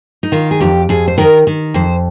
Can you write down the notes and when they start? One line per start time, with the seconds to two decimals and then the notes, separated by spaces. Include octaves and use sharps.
0.23 D#4
0.32 D#3 F4
0.51 G#4
0.60 F2 G4
0.89 F2 G#4
1.08 C5
1.18 D#3 A#4
1.47 D#3
1.74 F2 C5